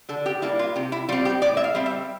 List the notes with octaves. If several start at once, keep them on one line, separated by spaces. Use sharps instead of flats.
D3 A4
G4
G3 A#3 D4 E4
F4
C3 G4
E4
G3 C4 F4
G4
A2 D5
E5
F5
G3 C4
E5